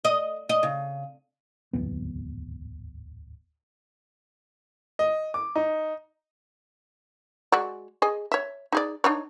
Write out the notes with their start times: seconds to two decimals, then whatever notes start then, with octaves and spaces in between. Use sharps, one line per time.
0.05 D#5
0.49 D#5
0.63 C#3
1.73 D1 G#1 E2 B3
4.99 D#5
5.34 D6
5.55 D#4
7.52 G#3 F#4 D5
8.02 G#4 D#5 G#5
8.32 C#5 E5
8.72 D#4 G#4 D5
9.04 D4 D#4 C#5